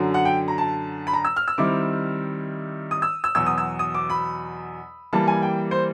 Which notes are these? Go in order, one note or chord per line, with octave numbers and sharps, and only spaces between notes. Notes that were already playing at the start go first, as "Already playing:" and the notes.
Already playing: F#2 D3 F#3
F#5
G5
A#5
A5
B5
A#5
E6
F6
E6
D#3 G3 C4 E4 D6
D#6
E6
E6
E2 B2 F#3 E6
D#6
E6
D#6
D6
B5
E3 G3 A#3 A5
G#5
G5
C5